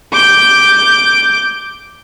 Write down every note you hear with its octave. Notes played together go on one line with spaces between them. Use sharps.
D6 G6